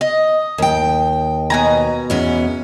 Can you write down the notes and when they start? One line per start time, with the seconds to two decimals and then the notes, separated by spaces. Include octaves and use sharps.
0.01 D#5
0.58 D#2 G5
1.50 B2 G#5 A#5
2.10 E2 B3 C#4